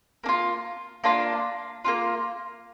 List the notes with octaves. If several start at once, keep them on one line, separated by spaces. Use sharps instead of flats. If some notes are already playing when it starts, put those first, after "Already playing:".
A#3 D4
F4
A#3 D4 F4
A#3 D4 F4